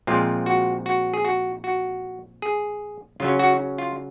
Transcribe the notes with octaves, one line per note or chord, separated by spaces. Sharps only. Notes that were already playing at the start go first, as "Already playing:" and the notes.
A#2 F3 G#3 C4 F4
F#4
F#4
G#4
F#4
F#4
G#4
C#3 F#3 C#4 F4
F#4
F4